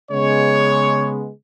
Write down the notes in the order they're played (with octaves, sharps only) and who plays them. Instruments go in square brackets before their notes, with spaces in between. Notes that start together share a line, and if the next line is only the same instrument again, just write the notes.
[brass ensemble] C#3 G#3 B3 C#5